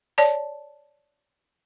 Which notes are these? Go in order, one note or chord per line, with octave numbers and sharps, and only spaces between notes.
C#5 D5 A5